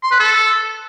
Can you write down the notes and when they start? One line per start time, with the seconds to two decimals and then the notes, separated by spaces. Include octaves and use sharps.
0.03 C6
0.11 B4
0.20 A4